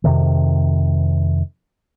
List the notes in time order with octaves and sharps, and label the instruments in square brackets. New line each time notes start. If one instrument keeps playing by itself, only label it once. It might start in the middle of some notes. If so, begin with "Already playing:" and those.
[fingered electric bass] F2 C3 D#3